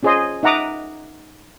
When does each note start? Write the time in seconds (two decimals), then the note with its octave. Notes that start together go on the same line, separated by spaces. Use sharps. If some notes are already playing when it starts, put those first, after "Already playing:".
0.03 C#4 F4 G#4 C5 D#5 C6
0.43 D#4 E5 F#5 A#5 D6 D#6